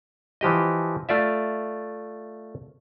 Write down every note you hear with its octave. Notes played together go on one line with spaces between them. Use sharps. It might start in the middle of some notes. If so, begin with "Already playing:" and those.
E3 F3 G4 D#5
A3 F4 D5 E5